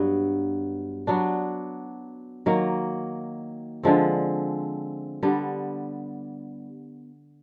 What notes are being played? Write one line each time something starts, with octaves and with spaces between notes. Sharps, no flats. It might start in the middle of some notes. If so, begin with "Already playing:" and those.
Already playing: G2 F#3 B3
F#3 B3 D4
D#3 F#3 A#3
D3 F3 G#3 C4
D3 G3 B3